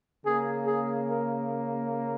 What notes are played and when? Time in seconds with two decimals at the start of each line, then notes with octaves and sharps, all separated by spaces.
0.24 C#3 A#3 G#4
0.66 G#4
1.08 A#4